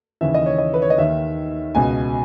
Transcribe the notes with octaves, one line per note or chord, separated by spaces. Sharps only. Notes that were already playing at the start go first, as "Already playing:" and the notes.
D#2 C#3 E3 E5
D#5
C#5
D#5
B4
C#5
D#5
D#2 D#3 E5
C#2 B2 G#5